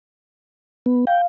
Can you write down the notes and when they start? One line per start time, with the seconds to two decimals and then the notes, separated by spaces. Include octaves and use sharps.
0.86 B3
1.07 F5 G5